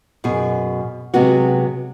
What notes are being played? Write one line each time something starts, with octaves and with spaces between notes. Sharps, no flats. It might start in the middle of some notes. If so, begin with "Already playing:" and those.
F#2 B2 G#4 G#5
C3 F#3 G#3 B3 F#4